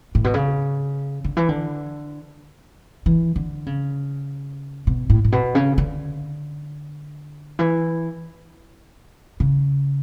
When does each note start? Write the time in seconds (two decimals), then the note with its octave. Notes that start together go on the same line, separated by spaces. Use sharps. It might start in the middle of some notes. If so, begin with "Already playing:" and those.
0.15 A2
0.24 B2
0.34 C#3
1.24 D3
1.37 E3
1.49 D3
3.06 E3
3.36 D3
3.66 C#3
4.87 B2
5.10 A2
5.24 A2
5.32 B2
5.55 C#3
5.78 D3
7.59 E3
9.40 C#3